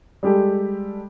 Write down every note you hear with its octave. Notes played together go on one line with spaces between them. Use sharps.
G3 G#3 G4 A4